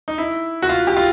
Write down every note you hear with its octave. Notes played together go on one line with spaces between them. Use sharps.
D#4
E4
F#4
F4
G4
F4